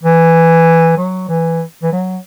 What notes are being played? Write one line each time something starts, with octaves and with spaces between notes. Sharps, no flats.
E3
F#3
E3
E3
F#3